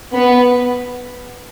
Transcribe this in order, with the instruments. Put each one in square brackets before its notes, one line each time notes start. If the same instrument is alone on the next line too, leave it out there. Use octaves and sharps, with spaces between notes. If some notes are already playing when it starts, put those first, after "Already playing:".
[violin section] B3 B4